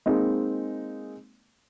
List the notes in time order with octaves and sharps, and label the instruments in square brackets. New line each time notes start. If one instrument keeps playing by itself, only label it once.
[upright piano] G#3 A#3 C4 D#4